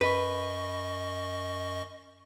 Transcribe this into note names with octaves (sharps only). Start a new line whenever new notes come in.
F#2 B4 D#5 C#6